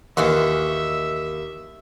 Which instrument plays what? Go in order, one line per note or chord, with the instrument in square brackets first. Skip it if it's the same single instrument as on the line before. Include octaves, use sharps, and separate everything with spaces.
[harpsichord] D#2 [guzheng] E3 F4 F#4 [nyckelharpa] E5